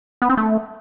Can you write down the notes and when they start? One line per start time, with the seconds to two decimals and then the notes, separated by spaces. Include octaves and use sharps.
0.22 B3
0.30 C4
0.37 A3